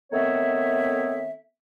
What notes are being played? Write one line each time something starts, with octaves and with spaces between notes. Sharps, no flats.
D#3 A3 B3 C4 C#5 E5